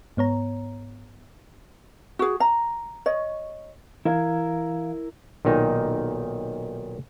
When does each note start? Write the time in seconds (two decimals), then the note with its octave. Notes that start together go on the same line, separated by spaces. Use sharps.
0.17 G#2 B3 C#5 A#5
2.19 F#4 G#4
2.40 A#5
3.06 C#5 D#5
4.05 E3 E4 A#4 F5 G#6
5.45 B1 A#2 D#3 D#4